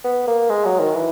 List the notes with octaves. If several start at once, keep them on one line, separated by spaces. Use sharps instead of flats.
B3
A#3
G#3
F#3
D#3
E3